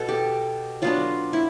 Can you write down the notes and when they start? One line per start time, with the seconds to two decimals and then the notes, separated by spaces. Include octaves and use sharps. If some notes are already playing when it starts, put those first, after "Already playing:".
Already playing: B2 B3 A4
0.09 G4
0.82 F#3 B3 D4 F4
1.33 E4